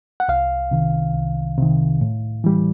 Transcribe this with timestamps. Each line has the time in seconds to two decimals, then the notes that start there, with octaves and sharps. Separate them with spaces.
0.20 F#5
0.28 C2 F5
0.71 C3 D#3
1.15 C2
1.57 C3
1.63 D#3
2.01 A2
2.44 E3 G3